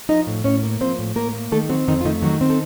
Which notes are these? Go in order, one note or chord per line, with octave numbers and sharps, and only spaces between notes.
F3 D#4 D#5
A2
A2 C#4 C#5
A#3
F3 C4 C5
A2
A2 A#3 A#4
A#3
D#3 A3 A4
F#3 C4 F#4
F2 D#3 D#4
F4
D#3 A3 D#4
D#3 F#3 F#4
C4
A4